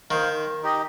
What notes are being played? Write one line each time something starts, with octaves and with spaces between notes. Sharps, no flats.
D#3 D#4 C5 F5
D#4 G4 D#5